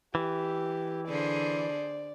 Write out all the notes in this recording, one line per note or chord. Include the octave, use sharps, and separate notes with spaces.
E3 G4
D3 G#4 C5 D5